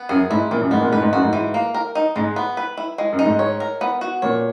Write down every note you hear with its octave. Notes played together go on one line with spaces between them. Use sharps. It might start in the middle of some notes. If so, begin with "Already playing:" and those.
Already playing: B3
F#2 G#4
G#2 E4
A#2 E3
F#2
G#2 B3
A#2
G#2 B4
G#2
F#2 F#4
G#2
E3
A#3
A#4
D#4
G#2 G#3
B3
B4
E4
G#3
F#2
D#4
G#2
C#5
A#4
B3
F#4
A#2 C#5